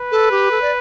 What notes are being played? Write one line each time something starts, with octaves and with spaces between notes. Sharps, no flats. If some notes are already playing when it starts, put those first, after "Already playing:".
Already playing: B4
A4
G4
A4
D5